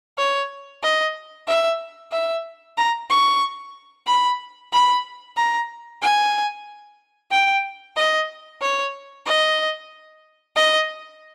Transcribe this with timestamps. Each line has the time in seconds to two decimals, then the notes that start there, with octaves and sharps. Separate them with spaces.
0.18 C#5
0.83 D#5
1.47 E5
2.12 E5
2.77 A#5
3.09 C#6
4.07 B5
4.72 B5
5.36 A#5
6.02 G#5
7.31 G5
7.96 D#5
8.62 C#5
9.26 D#5
10.56 D#5